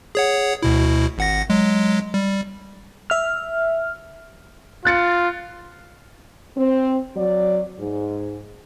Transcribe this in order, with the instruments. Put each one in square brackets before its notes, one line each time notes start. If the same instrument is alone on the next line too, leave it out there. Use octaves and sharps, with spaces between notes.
[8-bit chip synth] G#4 C#5 F#5
D2 B2 E4
G#1 F#5 A#6
F#3 G#3
G3
[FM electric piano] E5 F6
[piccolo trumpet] F4 [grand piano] F#6 A6 C#7
[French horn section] C4
F#3 D5
G#2